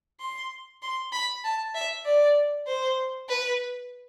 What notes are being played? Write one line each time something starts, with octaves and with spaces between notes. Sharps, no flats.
C6
C6
B5
A5
E5
D5
C5
B4